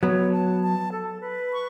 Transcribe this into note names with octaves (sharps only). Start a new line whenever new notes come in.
F#3 B3 C#5
A5
A5
A4
B4
C#6